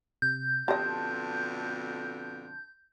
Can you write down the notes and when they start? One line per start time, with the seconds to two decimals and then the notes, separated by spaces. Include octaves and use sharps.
0.22 C3 G6
0.68 F2 B2 D3 G4 D#5 A5 C6